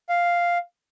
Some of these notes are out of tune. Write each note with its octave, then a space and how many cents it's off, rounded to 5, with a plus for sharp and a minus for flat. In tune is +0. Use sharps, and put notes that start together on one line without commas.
F5 +0